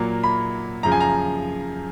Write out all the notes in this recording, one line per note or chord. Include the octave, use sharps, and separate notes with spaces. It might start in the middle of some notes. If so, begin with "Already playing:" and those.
Already playing: A#2 F#3 A#3
B5
F#2 C#3 F3 A#5
G#5
A#5